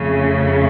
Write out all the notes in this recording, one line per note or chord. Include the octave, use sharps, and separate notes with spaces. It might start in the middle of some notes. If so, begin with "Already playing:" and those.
Already playing: F2 C#3 A3